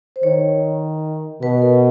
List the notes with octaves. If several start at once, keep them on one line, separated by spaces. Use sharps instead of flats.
C5
D#3 C#5
B2 B4
A#4